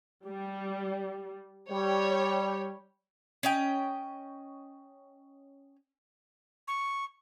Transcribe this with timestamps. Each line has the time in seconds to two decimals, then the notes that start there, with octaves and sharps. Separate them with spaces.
0.24 G3
1.69 G3 C#5 G5
3.43 C#4 D#5 G5
6.68 C#6